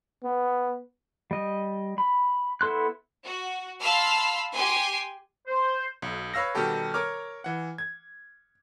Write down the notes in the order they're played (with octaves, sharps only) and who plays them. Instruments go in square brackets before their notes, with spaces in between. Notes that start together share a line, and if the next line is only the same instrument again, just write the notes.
[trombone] B3
[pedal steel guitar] G3 D#5
B5
B3 E4 A4 C6 F#6
[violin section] F#4
F5 A5 B5 C6 E6 F6
G4 G#5 C6 C7
[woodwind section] C5
[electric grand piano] B1
B4 C#5 F5 E6 A#6
B2 D#3 G3 G4 A4
A#4 C#5 D6 F6
E3 F#5
G#6